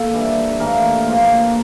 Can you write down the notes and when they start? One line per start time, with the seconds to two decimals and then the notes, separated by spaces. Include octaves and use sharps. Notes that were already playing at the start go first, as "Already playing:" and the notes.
Already playing: A#3 A4
0.13 E3 G3 D4
0.60 A2 E3 A#3 A#4
1.07 A#2 F3 A#3